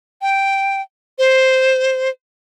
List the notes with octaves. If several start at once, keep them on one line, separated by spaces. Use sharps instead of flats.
G5
C5